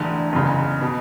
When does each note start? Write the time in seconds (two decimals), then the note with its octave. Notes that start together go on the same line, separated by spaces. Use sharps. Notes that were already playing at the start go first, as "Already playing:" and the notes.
Already playing: E1 E2 D3 A3
0.33 F#1 E2 C#3
0.81 B2